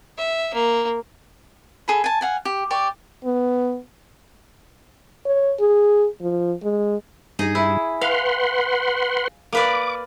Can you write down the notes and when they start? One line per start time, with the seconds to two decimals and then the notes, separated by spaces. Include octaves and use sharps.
0.18 E5
0.53 A#3
1.88 G#4 A4 B5
2.04 G#5 A5
2.21 F5 F#5 G#5
2.45 G4
2.71 G4 D5 C#6
3.25 B3
5.26 C#5
5.60 G#4
6.21 F3
6.63 G#3
7.39 G2 D#4 G#4 D#5
7.55 E4
8.01 B4 F5 F#5 C6
9.53 A#3 B4 D5 D6